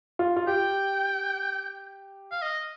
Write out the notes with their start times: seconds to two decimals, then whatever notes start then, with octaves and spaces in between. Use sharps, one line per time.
0.19 F4
0.36 F4
0.47 G4 G5
2.31 F5
2.42 D#5